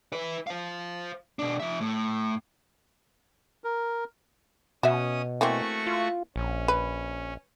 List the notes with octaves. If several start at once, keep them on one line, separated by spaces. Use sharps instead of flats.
E4 B4
C5 F5
B2 D4
F3 E5
A2
A#4
B2 C#4 F#4 E5 D#6
E3 A3 A#3 C4 F#4 C#6
F4
A#1 C#4
B4